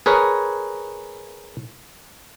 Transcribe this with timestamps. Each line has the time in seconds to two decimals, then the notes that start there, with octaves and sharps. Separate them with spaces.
0.06 G#4 A#4 B4 C#5